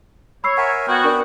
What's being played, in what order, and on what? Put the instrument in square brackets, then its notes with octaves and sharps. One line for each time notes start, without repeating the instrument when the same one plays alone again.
[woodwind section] C#5 [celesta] B5 E6 C7
[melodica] A#4 E5 G#5 [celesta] F#5
[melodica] B3 G5 [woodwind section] F#4 [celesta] F6 G#6
[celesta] D4 A#4 D5